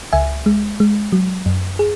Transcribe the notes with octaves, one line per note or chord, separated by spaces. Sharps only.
C#2 E5 G#5
G#3
G#3
F#3
F#2
G#4